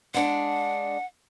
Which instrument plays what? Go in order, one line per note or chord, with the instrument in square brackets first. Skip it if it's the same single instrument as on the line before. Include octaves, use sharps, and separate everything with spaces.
[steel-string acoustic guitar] G#3 D4 [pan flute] F#5